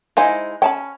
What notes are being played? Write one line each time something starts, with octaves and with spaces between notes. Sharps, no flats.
G#3 D#4 E4 C5 F5 G#5
C#4 G5 A5 B5